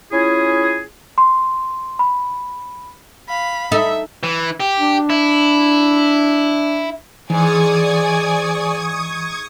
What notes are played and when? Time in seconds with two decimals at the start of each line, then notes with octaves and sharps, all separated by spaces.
0.12 C#4 E4 F4 G#4
1.18 C6
1.99 B5
3.29 F5 B5
3.72 D#4 A4 E5
4.23 E3
4.60 G4
4.79 D4
5.10 E4
7.30 G#2 E3 D5 G#5 C#6 D#6 G#6